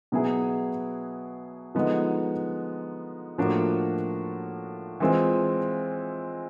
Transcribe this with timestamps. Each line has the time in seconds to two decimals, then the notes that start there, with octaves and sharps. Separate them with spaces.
0.12 B2 F#3 B3 E4 G#4
1.75 D3 F3 G#3 B3 D#4
3.38 A2 F3 A#3 D4 F#4
5.00 E3 G#3 C4 F4